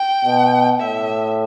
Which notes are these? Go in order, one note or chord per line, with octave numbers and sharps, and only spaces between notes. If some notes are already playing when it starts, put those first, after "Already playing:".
Already playing: G5
B2
A2 E5